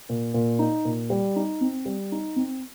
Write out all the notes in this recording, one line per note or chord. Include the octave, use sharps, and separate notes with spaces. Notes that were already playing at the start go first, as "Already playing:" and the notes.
A#2
A#2
D#4
A#2
G3
D#4
C4
G3
D#4
C4